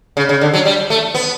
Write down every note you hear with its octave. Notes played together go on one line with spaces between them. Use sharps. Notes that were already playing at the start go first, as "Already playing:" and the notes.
C#3
C#3
D3
F#3
G3
A3
B3